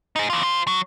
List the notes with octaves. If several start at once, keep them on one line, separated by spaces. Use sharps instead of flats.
D#4 G#4
E3 F4
F4 C5
F#3